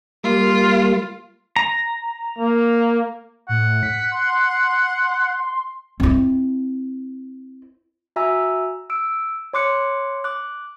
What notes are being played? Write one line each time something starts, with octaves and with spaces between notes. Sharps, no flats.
G3 A#3 F4
A#5
A#3
A2 F#5
B6
C6
C4 E4
F#4 E5 G#5 A#5 E6
E6 D7
C#5 C6 D6 F#6 C#7
D6 F#6